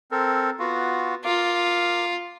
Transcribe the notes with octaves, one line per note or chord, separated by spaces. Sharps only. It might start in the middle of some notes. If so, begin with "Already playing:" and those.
C4 A4 A#4
B3 F4 F#4
F4 A#4 D6